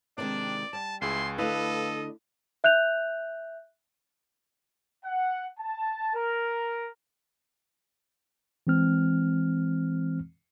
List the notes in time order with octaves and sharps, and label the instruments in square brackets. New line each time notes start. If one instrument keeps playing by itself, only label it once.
[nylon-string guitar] C3 D#3 G#3 [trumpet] D4 [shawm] D5
[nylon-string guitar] G3 [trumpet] A5
[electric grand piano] C#2 G#4 [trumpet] E4 [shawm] C6
[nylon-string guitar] D3 A3 E4 [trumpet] A4 [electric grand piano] B4 F5 [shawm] D#5
[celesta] E5 F#6 G6 F7
[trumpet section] F#5
A5
A#4
[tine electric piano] E3 G#3 C4 F6